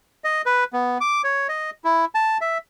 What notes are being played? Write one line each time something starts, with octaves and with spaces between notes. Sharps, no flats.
D#5
B4
B3
D6
C#5
D#5
E4
A5
E5